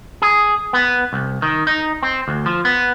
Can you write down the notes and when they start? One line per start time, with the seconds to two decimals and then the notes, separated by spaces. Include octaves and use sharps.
0.22 G#4
0.73 B3
1.13 C2
1.42 D#3
1.67 D#4
2.03 C4
2.28 D2
2.46 F3
2.65 B3